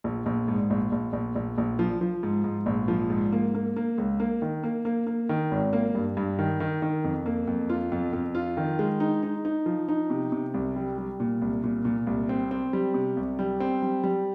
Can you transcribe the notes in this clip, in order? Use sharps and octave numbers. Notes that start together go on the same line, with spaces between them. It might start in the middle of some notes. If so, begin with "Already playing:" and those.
A#1
A#1
G#2
A#1
A#1
A#1
A#1
A#1
F3
F3
G#2
G#2
A#1
F3
G#2
A#3
A#3
A#3
C#2
A#3
D#3
A#3
A#3
A#3
D#3
G#1
A#3
G2
G2
D#3
D#3
D#3
F2
A#3
F2
F4
F2
F2
F4
D#3
G#3
D#4
D#4
D#4
F3
D#4
C3
C3
C2
G3
G3
A#2
C2
A#2
A#2
C2
C4
C4
G3
C3
C2
G3
C4
G3
G3